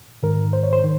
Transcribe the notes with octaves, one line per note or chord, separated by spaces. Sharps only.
G#2 D#3 A#4
C5
C#5
C5
D#3